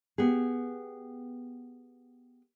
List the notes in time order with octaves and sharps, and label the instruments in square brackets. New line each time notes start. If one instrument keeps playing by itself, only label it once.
[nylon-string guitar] B3 G4 G#4